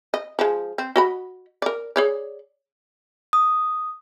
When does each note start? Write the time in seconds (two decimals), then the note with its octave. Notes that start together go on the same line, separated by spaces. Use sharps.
0.14 D#5
0.39 F3 G#3
0.78 C4
0.96 F#4 D#5 B5
1.62 A#4 D5
1.96 G#4 C#5 D5
3.33 D#6